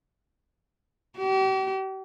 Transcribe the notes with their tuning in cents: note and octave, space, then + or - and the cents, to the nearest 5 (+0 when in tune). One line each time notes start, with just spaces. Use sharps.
G4 -40